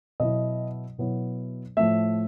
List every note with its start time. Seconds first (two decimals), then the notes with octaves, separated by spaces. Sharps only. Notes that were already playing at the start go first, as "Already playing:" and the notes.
0.20 B2 F#3 B3 E4 D#5
0.98 B2 F#3 B3 E4
1.77 A2 F3 A3 E5